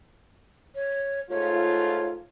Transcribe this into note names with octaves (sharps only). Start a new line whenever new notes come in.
C#5
G#2 A3 F4 C#5